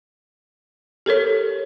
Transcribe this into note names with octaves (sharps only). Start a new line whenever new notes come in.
G4 A4 A#4 C#5